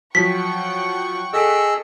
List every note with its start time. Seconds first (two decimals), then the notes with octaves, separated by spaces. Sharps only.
0.15 F3 F#3 F#5 G5 C#6 B6
1.33 G#4 A4 D#5 E6 B6 D7